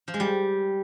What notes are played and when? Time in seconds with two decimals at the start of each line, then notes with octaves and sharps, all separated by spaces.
0.08 F3
0.14 G#3
0.20 G3